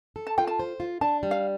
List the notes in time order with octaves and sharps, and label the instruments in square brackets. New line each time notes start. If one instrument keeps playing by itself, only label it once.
[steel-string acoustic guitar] A4
[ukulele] A5
[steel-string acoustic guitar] F4 [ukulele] G5
[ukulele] A5
[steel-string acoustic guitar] C5
F4
[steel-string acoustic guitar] D4 [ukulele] A5
[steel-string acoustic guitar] G3
[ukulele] F5